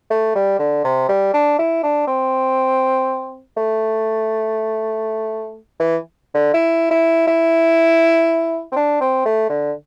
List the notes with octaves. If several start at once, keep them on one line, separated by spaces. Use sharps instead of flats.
A3
G3
D3
C3
G3
D4
E4
D4
C4
A3
E3
D3
E4
E4
E4
C4
D4
C4
A3
D3